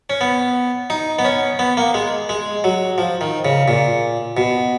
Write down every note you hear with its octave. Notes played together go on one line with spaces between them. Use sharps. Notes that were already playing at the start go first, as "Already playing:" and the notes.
C#4
B3
D#4
B3
C#4
B3
A#3
G#3
G#3
F#3
F3
D#3
C#3
A#2
B2